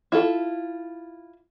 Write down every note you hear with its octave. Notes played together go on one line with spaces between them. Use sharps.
E4 F4 A4